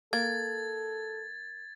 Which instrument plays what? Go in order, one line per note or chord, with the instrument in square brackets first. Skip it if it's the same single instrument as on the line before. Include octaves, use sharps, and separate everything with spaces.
[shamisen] A#3 [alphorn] A4 [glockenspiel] G#6 [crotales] A6